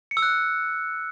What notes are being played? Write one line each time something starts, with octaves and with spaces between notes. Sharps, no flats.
C#7
E6
F#6